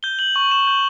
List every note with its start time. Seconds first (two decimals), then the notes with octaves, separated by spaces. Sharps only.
0.03 G6 G7
0.19 G6 F#7
0.35 C#6 F#7
0.51 C#6 E7
0.67 G6 F#7